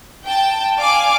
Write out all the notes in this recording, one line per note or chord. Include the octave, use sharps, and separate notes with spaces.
G5 A5
D5 F5 G#5 D6